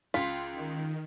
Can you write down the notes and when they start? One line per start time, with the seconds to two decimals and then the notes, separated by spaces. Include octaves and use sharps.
0.14 C#2 F4 C6 B6
0.53 D#3